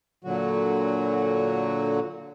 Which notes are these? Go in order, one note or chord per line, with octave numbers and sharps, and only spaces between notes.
A#2 D3 F#3 F#4